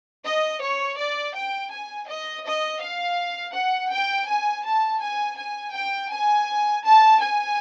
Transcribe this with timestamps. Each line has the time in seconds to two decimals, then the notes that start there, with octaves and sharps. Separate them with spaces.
0.23 D#5
0.60 C#5
0.97 D5
1.33 G5
1.70 G#5
2.07 D#5
2.44 D#5
2.79 F5
3.53 F#5
3.90 G5
4.26 G#5
4.63 A5
5.00 G#5
5.36 G#5
5.73 G5
6.09 G#5
6.83 A5
7.19 G#5